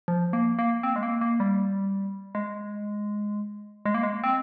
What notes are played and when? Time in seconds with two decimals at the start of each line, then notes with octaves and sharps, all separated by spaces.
0.08 F3
0.33 A#3
0.59 A#3
0.83 C4
0.96 G#3
1.03 A#3
1.21 A#3
1.40 G3
2.35 G#3
3.85 G#3
3.94 A#3
4.03 G#3
4.24 C4